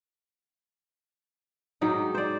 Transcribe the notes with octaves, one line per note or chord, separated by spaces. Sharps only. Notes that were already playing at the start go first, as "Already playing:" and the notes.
G#2 F#3 D#4 G5
C5 D5